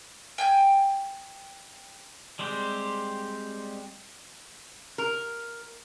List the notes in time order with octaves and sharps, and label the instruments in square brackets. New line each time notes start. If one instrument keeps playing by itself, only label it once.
[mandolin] G5 G#5 G6
[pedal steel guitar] G3 G#3 C4 G4
[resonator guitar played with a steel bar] A#4